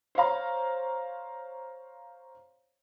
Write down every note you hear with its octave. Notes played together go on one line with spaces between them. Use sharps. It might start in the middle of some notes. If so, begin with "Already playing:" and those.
C5 C#5 F5 A#5